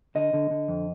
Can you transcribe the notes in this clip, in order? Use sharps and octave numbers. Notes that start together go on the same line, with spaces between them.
D3 D#5
D3
D3
F2